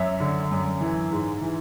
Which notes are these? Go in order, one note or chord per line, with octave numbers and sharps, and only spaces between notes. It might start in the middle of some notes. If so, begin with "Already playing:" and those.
Already playing: F#2 C#5 E5
D3
F#2
E3
G#2
E3